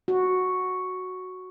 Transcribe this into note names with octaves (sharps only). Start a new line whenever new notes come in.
F#4